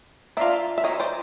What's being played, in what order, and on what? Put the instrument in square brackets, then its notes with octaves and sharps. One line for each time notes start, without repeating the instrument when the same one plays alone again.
[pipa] A#3 D4 F4 [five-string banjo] D5 E5
[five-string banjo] E5
[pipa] D3 F#3 A#3 [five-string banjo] C#5 D#5
[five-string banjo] C5 D5